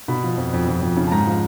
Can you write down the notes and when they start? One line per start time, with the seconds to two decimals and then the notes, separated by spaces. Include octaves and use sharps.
0.08 B2 B5
0.23 F3
0.37 F2
0.53 F2
0.68 F2
0.82 F2
0.97 C#3
1.07 A5
1.11 G#2 A#5
1.27 F3